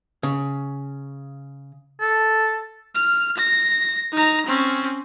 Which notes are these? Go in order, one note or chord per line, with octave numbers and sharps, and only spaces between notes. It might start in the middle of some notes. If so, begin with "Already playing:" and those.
C#3
A4
F6
A#6
D#4 A#5
C4 C#4